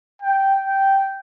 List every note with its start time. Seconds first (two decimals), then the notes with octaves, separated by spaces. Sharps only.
0.22 G5
0.66 G5